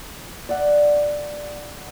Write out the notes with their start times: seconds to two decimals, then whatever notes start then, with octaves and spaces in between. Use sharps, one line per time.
0.49 D5 E5 F#5